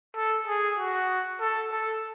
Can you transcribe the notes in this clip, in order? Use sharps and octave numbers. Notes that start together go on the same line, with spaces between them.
A4
G#4
F#4
A4
A4